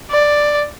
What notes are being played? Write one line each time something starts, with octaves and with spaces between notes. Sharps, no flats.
D5